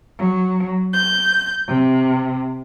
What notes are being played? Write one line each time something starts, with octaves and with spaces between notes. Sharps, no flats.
F#3
G6
C3